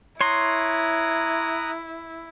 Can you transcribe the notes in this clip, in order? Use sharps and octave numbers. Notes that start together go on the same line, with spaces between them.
E4 C#5 A#5 C6 D#6 F#6